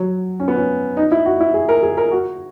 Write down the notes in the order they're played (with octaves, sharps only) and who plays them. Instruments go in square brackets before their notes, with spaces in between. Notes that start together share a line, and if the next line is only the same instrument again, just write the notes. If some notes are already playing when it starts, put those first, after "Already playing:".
Already playing: [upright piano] F#3
C#4
B3
C#4
D#4
E4
F#4
E4
G#4
A#4
G#4
A#4
F#4